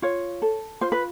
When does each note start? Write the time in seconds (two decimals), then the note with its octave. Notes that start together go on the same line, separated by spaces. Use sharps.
0.02 F4 C#5
0.42 A4
0.81 F4 C5
0.92 B4